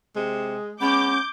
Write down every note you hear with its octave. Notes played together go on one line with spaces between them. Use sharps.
C3 G#3
G#3 B3 C#4 D6 G6